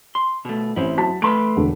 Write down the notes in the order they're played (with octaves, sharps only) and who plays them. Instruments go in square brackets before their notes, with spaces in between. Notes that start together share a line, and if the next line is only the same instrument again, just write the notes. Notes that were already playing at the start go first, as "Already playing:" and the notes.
[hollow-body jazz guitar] C6
B2 A3
[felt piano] A1 C5 [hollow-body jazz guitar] C4 E4
[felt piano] F#3 A5 B6
[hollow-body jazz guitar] A3 B4 [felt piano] C6 D7
[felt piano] E1 D3 D4